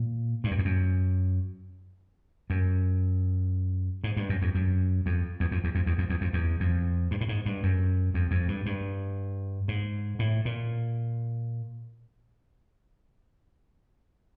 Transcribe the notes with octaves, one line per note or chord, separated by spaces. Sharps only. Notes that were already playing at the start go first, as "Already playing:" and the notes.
Already playing: A#2
G2
F#2
F2
F#2
F#2
G#2
G2
F#2
F2
F#2
F2
E2
F2
E2
F2
E2
F2
E2
F2
E2
F2
G2
A2
G#2
G2
F#2
F2
F2
G2
G2
G#2
A2
A#2